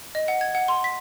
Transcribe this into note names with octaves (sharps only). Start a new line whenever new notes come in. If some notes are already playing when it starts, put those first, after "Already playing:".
D#5
F#5
G#6
F#5
C6
B6